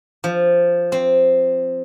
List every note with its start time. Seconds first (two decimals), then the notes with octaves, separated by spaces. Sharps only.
0.24 F3
0.92 C4